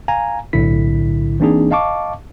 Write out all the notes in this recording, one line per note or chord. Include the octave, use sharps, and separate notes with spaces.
F5 G#5 A#5
B1 A2 D3 E4 B6
E3 A#3 C4 D4 D#4 G#4
D#5 F5 A5 C#6 D6